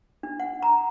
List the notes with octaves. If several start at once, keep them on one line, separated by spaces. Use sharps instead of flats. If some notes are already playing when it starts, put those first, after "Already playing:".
D4
F#5
A#5